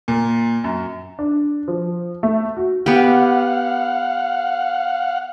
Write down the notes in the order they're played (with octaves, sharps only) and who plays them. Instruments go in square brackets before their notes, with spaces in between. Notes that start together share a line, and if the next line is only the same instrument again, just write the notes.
[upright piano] A#2
F#2
[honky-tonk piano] D4
F3
A3
F#4
[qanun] B3 G4 [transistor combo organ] F5 F#5